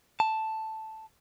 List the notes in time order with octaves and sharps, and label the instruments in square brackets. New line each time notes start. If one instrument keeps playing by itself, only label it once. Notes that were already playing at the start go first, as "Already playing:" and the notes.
[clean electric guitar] A5